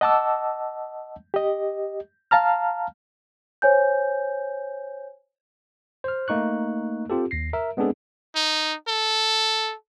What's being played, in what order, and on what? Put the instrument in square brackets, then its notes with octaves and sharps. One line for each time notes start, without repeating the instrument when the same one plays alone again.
[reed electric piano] D#5 F#5 A5 D6 E6
G4 D#5
F5 A5 A#5 F6
[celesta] C5 C#5 G#5 G6
[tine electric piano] C5 F6
A3 A#3 D#4 C#6 F#6
C4 F4 G4 A4
D#2 A#6 C7
A#4 E5
G#3 B3 C4 D4 G#4 A4
[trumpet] D#4
A4